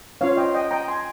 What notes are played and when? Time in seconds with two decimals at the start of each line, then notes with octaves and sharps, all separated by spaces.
0.21 C#4 F4 C5 C#5 F5
0.37 D#5 G5
0.54 D#5 G5
0.71 G5 A#5
0.88 G#5 C6